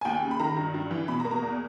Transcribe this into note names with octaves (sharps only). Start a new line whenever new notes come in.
G#5
D#2 G5
C#3
B5
D#3 A#5
G2
G2
E3
B2 B5
A#5
A#3
A#5
E2